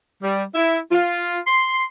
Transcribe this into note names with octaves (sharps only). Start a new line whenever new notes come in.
G3
E4
F4
C6